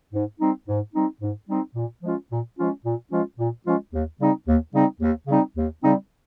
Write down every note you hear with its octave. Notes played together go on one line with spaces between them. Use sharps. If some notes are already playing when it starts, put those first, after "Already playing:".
G#2
G3 C4 D#4
G#2
G3 C4 D#4
G#2
G3 C4 D#4
A#2
F3 G#3 C#4 F4
A#2
F3 G#3 C#4 F4
A#2
F3 G#3 C#4 F4
A#2
F3 G#3 C#4 F4
D#2
C#3 G3 C4 D#4
D#2
C#3 G3 C4 D#4
D#2
C#3 G3 C4 D#4
D#2
C#3 G3 C4 D#4